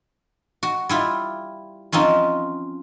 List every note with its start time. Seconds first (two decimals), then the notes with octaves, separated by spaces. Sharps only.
0.63 F#4
0.89 G3 E4 F4
1.92 F3 C4 C#4 D#4 F4